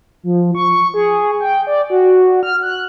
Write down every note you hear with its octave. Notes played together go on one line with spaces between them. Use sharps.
F3
C#6
G#4
G5
D5
F#4
F6
F#6